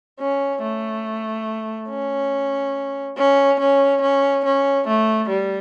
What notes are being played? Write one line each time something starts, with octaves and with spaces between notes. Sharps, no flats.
C#4
A3
C#4
C#4
C#4
C#4
C#4
A3
G3